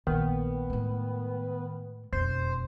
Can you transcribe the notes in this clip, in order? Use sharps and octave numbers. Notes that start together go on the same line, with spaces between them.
A#1 D#3 B3
A2 G#3
E1 F2 C5